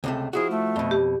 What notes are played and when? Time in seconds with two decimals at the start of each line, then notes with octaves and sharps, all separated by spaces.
0.04 C#2 C3 A3
0.33 F3 E4 F#4 G#4
0.51 A3
0.76 F2 B2
0.91 G4